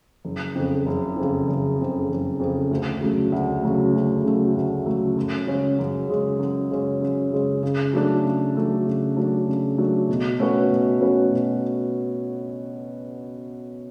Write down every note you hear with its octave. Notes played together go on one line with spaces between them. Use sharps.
F#1
F2 C#3
F#1
F2 C#3
F#1
F2 C#3
F#1
F2 C#3
D2
C#3 F#3 A3
D2
C#3 F#3 A3
D2
C#3 F#3 A3
D2
C#3 F#3 A3
F#2
C#3 G#3 C#4
F#2
C#3 G#3 C#4
F#2
C#3 G#3 C#4
F#2
C#3 G#3 C#4
C#3
F#3 A3 D4
C#3
F#3 A3 D4
C#3
F#3 A3 D4
C#3
F#3 A3 D4
B2
A3 C#4 F#4 B4
B2
A3 C#4 F#4 B4
B2